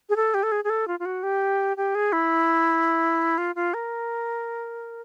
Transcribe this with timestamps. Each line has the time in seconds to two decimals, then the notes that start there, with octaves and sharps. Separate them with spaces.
0.09 G#4
0.16 A4
0.34 G4
0.43 A4
0.52 G#4
0.64 G#4
0.70 A4
0.88 F4
1.00 F4
1.05 F#4
1.23 G4
1.77 G4
1.95 G#4
2.13 E4
3.38 F4
3.55 F4
3.74 A#4